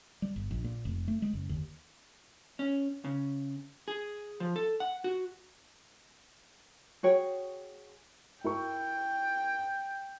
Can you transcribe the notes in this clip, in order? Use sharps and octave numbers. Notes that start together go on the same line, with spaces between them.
G3
G1
A#1
A#2
F1
A3
G#3
F#1
D#2
C#4
C#3
G#4
F3
A4
F#5
F#4
F#4 G#4 C#5 G5
E4 A#4 G5 C#6